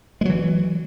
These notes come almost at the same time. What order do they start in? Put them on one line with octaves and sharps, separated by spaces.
G#3 F#3 E3